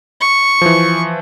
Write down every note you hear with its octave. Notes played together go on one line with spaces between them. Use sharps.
C#6
E3 F3